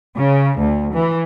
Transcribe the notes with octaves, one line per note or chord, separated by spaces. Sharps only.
C#3
D2
E3